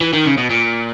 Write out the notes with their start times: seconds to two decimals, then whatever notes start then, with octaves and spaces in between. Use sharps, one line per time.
0.01 E3
0.13 D#3
0.25 C#3
0.38 B2
0.50 A#2